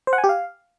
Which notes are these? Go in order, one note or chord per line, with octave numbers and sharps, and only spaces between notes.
C5
F#5
G#5
G4
F5